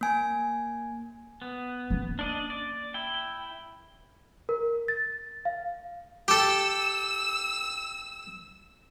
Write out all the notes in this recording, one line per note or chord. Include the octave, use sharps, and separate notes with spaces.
A#3 G#5
B3
A#3 C#4
D4 D5 D#5
D5
E4 G5
A#4
A6
F5
G4 A4 E6